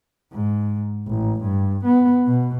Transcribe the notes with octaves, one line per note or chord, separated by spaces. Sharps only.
G#2
A1
G2
B3
B2